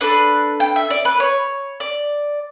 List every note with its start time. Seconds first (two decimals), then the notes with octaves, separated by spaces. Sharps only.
0.01 D4 A4 B4
0.60 G5
0.76 E5
0.90 D5
1.05 B4
1.20 C#5
1.80 D5